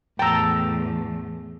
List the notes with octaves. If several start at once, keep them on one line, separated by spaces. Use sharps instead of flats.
E2 A2 G5 A5 A#5 E6